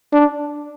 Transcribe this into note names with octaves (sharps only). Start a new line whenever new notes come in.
D4